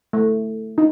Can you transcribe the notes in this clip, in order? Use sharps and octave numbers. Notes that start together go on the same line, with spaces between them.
A3
D#4